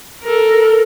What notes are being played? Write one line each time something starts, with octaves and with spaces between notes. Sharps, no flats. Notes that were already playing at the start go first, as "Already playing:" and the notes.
A4 A#4